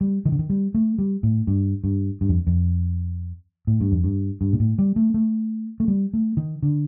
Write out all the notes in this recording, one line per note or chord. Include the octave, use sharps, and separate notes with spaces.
G3
D#3
D3
D#3
G3
A3
G3
A2
G2
G2
G2
F2
F2
A2
G2
F2
G2
G2
A#2
A2
G3
A3
A3
A3
G3
A3
D#3
D3